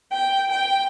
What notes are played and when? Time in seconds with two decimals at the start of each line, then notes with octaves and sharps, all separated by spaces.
0.13 G5
0.51 G5